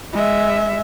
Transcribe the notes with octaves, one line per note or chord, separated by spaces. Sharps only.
G#3 E5